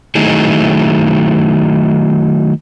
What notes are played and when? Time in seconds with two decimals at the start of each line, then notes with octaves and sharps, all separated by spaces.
0.15 D#3 F#3 A3 D#4 E4 G#4